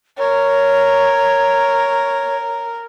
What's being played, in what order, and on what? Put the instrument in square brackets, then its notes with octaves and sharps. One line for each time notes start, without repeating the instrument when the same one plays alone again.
[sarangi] A#4 [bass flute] C#5